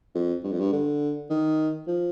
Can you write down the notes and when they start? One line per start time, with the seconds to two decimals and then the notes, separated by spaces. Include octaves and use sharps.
0.15 F2
0.44 G2
0.52 F2
0.60 G2
0.73 D3
1.30 D#3
1.87 F3